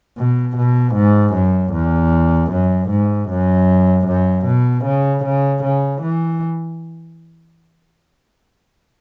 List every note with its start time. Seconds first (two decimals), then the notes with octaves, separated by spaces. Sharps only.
0.18 B2
0.57 B2
0.95 G#2
1.34 F#2
1.73 E2
2.52 F#2
2.90 G#2
3.30 F#2
4.07 F#2
4.46 B2
4.85 C#3
5.25 C#3
5.64 C#3
6.02 E3